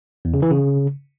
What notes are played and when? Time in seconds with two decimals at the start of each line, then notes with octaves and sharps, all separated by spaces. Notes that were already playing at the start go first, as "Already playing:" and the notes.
0.25 E2
0.34 C#3
0.42 E3
0.51 C#3